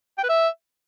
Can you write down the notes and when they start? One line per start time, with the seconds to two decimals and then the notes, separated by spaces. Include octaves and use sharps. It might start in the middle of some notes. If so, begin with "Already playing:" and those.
0.18 G5
0.24 B4
0.29 E5